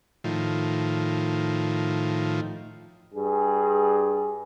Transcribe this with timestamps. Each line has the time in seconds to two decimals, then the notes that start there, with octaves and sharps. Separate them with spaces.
0.24 A2 D#3 F3
3.14 G2 G#4